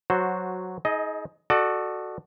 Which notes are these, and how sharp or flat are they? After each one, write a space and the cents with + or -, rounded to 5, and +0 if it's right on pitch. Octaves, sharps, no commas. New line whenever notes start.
F#3 +0 F#4 -10 C5 +0
D#4 +35 G#4 +35 D#5 +0
F#4 +0 A4 +0 D5 +35